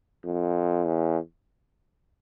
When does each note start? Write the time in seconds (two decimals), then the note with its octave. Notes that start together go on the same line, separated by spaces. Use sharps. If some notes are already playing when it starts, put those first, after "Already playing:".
0.24 F2
0.85 E2